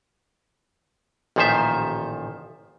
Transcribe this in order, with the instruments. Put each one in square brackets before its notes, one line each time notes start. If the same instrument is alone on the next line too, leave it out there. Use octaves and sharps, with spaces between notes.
[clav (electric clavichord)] A1 A#2 D#3 F3 C5 E5